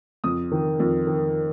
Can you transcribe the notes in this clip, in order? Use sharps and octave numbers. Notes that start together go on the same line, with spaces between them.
F2 D#6
D#3
F2
D#3